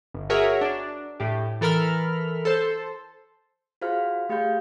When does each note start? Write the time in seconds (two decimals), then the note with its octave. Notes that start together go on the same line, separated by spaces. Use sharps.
0.14 G1
0.30 F#4 G#4 A#4 C#5 E5
0.61 D4
1.20 A2 G4
1.61 E3 A4 A#4 B5 F6
2.45 A4 C5
3.82 F4 F#4 G#4 C5 F5 F6
4.29 A3 G4 G#4 F5 G6